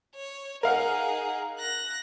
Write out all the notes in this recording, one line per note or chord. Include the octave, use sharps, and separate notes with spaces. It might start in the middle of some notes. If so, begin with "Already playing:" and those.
C#5
D#4 G#4 A#4 F5 F#5
F#6 A#6